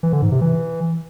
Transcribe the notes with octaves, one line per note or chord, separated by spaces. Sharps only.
E3
D3
G#2
C3
E3